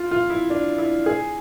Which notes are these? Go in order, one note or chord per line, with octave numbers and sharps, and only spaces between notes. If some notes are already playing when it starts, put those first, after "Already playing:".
Already playing: F4
F4
E4
D4
E4
G#4